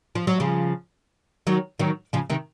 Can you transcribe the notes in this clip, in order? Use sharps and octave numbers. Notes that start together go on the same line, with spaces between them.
F3
F#3
C#3 F3
D#3 F#3
D#3 F#3
C#3 F3
C3 D#3